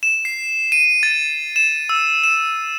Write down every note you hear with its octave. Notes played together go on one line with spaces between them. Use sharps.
E7
C7
D#7
A6
E7
E6
E7